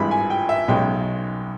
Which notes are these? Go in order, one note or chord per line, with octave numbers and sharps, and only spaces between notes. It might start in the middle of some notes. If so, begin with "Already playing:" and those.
Already playing: G#1 G2 E3 G#3 B5
G#5
G5
E5
B1 B2 G#3 C#4 G5